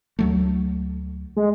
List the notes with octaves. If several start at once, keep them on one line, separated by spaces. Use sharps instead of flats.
D2 F#3 A3
G#3